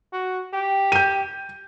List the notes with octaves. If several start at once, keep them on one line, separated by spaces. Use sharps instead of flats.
F#4
G4
G6 D#7